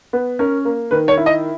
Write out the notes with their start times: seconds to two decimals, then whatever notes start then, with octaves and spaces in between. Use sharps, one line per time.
0.13 B3
0.39 C#4 A#4
0.65 A#3
0.91 D#3 B4
1.08 C#5
1.17 E4
1.26 D#5